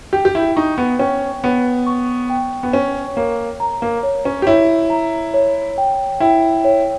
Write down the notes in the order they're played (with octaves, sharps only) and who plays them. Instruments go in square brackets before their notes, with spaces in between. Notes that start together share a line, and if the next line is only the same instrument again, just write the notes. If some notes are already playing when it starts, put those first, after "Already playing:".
[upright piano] G4 [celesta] G5
[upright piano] G4
E4
[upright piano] D#4 [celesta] C#6
[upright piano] B3
[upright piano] C#4 [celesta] G5
[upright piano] B3 [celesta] C#5
[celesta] C#6
G5
[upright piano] B3
[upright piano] C#4 [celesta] C#5
[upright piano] A#3 [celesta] C#5
[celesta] A#5
[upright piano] A#3
[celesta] C#5
[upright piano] C#4
G4
[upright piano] E4 [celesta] C#5
[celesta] A#5
C#5
G5
[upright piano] E4 [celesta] G5
[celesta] C#5